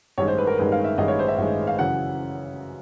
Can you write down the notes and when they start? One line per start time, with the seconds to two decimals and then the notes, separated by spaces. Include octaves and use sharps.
0.18 A1 G2 D#3 G#3 C#5
0.28 C5
0.38 B4
0.47 A#4
0.58 A1 G2 D#3 G#3 B4
0.72 F5
0.84 E5
0.98 A1 G2 D#3 G#3 D#5
1.08 C#5
1.19 C5
1.28 E5
1.38 A1 G2 D#3 G#3
1.67 F5
1.78 F#2 C#3 E3 F#5